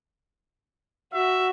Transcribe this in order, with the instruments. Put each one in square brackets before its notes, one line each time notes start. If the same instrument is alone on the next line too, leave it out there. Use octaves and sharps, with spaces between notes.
[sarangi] F#4 [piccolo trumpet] E5